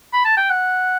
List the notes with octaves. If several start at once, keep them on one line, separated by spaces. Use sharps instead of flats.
B5
A5
G5
F#5